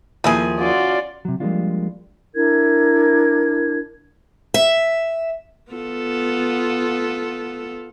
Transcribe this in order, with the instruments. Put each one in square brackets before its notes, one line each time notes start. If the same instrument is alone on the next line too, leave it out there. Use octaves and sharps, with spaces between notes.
[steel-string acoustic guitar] D#2 F3 [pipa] A3 E4 G#4
[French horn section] C#4 F4 F#4 [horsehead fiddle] D5
[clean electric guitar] C3 F#3
F3 G3 G#3 A#3 D4 F4
[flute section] D4 E4 A#4 G#6
[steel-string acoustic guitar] E5
[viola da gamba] B3 F4 A4